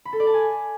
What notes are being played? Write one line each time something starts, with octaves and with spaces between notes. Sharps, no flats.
B5
A4
D5
A5
G#5